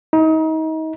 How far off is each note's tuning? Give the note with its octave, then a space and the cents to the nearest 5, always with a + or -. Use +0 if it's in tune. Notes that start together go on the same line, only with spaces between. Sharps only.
D#4 +30